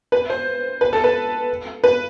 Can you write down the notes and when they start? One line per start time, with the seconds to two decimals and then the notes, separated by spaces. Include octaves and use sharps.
0.12 B4
0.30 C5
0.81 B4
0.93 A4
1.04 B4
1.84 B4